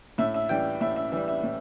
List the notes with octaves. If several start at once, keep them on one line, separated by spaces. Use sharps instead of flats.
A2 E5
E5
E3 G3 G5
A2 E5
E5
E3 G3 E5
E5
A2